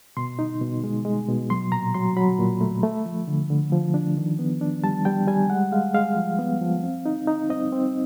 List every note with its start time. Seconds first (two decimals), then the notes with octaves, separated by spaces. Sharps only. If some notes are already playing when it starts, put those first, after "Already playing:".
0.17 B2 C6
0.39 D#4
0.61 B2
0.84 G#3
1.05 G#3
1.28 B2
1.50 F#3 C6
1.72 A#2 A#5
1.95 F#3 C6
2.17 F#3 B5
2.39 A#2
2.61 A3
2.83 A3
3.06 F3
3.28 D3
3.50 D3
3.72 F3
3.94 D4
4.17 D#3
4.39 B3
4.61 D4
4.84 G3 A5
5.05 G3 G5
5.28 G3 G#5
5.50 G#3 F#5
5.72 G#3 F5
5.94 G#3 F5
6.17 F3
6.39 B3
6.61 F3
6.83 C4
7.06 D#4
7.27 D#4
7.49 C4 D#5
7.72 C4